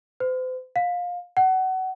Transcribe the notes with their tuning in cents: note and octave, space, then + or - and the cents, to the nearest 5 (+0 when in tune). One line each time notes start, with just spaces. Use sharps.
C5 -40
F5 +25
F#5 +25